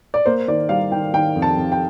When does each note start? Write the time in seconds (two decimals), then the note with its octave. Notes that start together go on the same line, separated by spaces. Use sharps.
0.14 D5
0.26 A#3 C5
0.48 D#3 D5
0.69 G3 F5
0.92 D#3 G5
1.14 D#3 G5
1.35 F2
1.42 A5
1.57 F2
1.72 G5